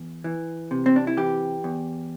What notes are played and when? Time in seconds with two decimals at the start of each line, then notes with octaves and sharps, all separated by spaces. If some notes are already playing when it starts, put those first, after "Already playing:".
Already playing: E2
0.24 E3
0.71 C3
0.86 C4
0.96 D4
1.07 E4
1.17 E3 G4
1.64 E2